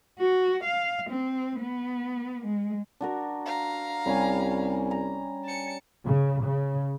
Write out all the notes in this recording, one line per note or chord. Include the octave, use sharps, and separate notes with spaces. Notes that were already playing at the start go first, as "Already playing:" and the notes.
F#4
F5
C4
B3
G#3
D4 F#4 A#4
F5 A#5
C2 G3 C#4 G#5
A#5
A5 C#7
C#3
C#3